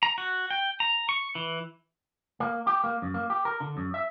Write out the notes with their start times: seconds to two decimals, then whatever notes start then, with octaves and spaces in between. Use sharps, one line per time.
0.03 A#5
0.18 F#4
0.50 G5
0.80 A#5
1.09 C#6
1.35 E3
2.40 A#3
2.67 G4
2.84 A#3
3.02 F#2
3.14 A#3
3.30 G4
3.45 A#4
3.60 D3
3.77 F#2
3.94 E5